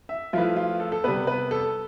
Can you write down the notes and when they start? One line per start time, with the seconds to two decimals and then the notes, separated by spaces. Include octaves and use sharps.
0.09 E5
0.33 F3 A3 E4 F4 B4
0.56 F4
0.80 A4
0.92 A4
1.04 C3 G3 B3 B4
1.27 B4
1.51 A4